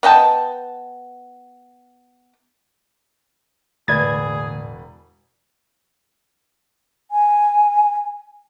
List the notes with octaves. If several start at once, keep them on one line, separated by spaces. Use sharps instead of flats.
B3 D#5 G5 A5
E1 A2 D3 G#4 B4 D5 G#6
G#5